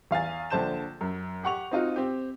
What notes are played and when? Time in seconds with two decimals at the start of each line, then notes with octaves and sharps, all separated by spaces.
0.11 E2 F5 G#5 A6
0.50 A#1 D3 C5 A5 G6 E7
1.01 F#2
1.43 G4 F#5 C#6 F7
1.71 C4 D#4 F4 F#4
1.96 C4 G4